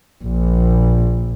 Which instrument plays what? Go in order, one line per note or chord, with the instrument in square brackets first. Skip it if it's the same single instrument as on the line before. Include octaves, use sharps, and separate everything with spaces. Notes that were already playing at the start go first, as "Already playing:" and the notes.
[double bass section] A#1